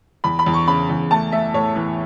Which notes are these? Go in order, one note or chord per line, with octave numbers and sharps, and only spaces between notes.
E2 B5
B5
E2
C#6
C#3 B5
E2
A3 A5
A3 E5
A2 C#5
E3